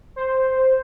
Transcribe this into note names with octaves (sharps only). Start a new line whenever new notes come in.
C5